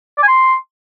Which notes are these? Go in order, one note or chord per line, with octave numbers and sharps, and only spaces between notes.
D5
G#5
C6